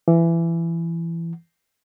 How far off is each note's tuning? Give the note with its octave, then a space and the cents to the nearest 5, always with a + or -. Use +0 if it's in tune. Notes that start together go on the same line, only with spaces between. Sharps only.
E3 +20